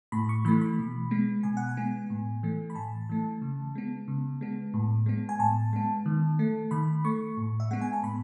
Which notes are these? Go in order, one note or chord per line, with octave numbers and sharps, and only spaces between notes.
A2 B5
C#6
E3 A3 B5
B5
B2
G#3 B3
B2 G#5
F#5
G#5
G#3 B3
A2
E3 A3
B5
A2 A5
E3 A3
C#3
G#3 B3
C#3
G#3 B3
A2
G#3 B3
G#5
A2 A5
G#3 B3
D#3
A3
D#3 B5
A3 C#6
A2
E5
G#3 B3 F#5
G#5
A5
A2 B5